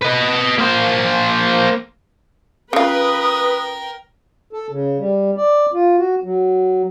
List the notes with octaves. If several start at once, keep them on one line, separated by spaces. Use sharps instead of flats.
B4 D#5
A#3 C5
C#3 F4 A#4 B4 G5 D#6
A4
C#3
G3
D5
F4
F#4
F#3